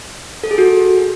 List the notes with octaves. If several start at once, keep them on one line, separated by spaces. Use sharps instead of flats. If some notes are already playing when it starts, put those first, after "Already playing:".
A4
G#4
F#4